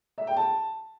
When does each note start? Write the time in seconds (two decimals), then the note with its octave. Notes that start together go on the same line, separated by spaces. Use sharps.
0.18 E5
0.27 G5
0.37 A5